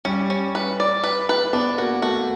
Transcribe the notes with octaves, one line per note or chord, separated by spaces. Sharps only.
G3 C#4
C#4
B4
D5
B4
B4
B3 D4
A#3 F#4
A3 F#4